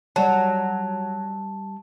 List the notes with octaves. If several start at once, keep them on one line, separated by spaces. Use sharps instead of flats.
F#3 G3 A5